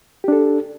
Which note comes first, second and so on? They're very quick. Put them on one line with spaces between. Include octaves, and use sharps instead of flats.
G4 D4 A4